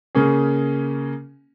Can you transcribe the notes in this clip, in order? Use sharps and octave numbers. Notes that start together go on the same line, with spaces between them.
C#3 A#3 C#4 G#4